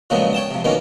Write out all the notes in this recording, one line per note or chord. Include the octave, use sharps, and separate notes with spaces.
A#2 C#3 F3 F#3 G#3 B3
C#5 G5 A5 D#6
C3 F3
B2 D#3 E3 G3 A#3 C#4